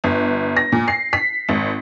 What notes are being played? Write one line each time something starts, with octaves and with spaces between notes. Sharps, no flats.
G1
A#6
A#2
C7
B6
G#1